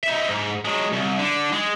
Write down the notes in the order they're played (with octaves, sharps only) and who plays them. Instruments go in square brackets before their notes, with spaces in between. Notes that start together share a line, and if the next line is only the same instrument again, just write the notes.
[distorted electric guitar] D#4 E5
G#2
F#3 G#3
C2
D3
G#3